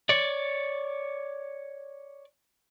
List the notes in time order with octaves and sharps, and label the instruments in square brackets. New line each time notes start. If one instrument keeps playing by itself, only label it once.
[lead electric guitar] C#5 D5